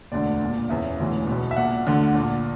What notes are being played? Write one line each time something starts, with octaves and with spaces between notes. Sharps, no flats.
E1 D2 D3 D5
A#1 A#2
F#1 E2 C#3 E5
E1 D2 C#3 E3
B1 B2
E5
A#1 A#2 F#5
D2 D3
A#1 A#2